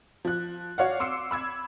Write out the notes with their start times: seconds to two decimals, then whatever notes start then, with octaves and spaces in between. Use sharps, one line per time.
0.25 F3 F#6
0.78 F#4 C#5 D5 F5 F#5
1.00 C6 D6 E6 C7 C#7
1.31 B5 E6 G#6